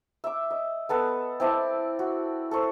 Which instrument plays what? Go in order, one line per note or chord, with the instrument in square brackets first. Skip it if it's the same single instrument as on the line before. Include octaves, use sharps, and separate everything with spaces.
[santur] E5 D6
D#5
B3 A4 B4
C4 E4 D5 A5
F#4
A4 C5 C#6